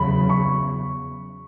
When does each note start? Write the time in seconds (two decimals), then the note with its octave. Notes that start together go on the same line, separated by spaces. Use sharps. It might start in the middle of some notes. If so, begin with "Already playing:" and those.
Already playing: E2 C#3 F#3 B5
0.30 C#6